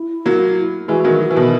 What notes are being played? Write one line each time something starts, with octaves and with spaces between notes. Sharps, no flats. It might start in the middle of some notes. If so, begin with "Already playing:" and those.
Already playing: E4
F#3 A#3
E4
E3 G#3 F#4
D#3 F#3
E3
B2 D#3